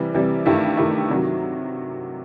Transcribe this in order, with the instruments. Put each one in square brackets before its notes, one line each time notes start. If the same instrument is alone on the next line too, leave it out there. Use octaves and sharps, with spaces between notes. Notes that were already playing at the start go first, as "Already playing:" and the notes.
Already playing: [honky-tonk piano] C3 E3 G3
C3 E3 G3
G2 D#3 A3 E4 G4
G2 D#3 A3 E4 G4
C3 D#3 F#3